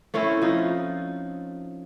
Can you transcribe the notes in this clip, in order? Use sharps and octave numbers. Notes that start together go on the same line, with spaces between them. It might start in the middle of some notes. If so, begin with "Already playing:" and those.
A3 C4 C#4 E4
F3 D#4